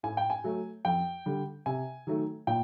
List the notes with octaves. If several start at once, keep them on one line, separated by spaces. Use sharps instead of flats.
A2 G#5
G5
G#5
F#3 A3
F2 G5
D3 G3
C3 G#5
D#3 F#3 A3
A#2 G5